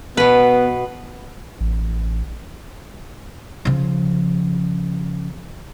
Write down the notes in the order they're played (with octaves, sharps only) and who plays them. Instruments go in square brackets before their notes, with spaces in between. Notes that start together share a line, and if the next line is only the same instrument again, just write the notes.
[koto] B2 B4 [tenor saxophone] B3
[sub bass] A1
[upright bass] C#3 F3